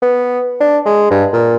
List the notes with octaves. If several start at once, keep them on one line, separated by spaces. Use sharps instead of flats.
B3
D4
G#3
G2
A#2